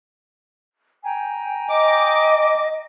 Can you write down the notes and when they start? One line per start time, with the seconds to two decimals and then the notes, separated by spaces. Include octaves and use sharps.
1.04 G5 G#5 A#5
1.69 D#5 D6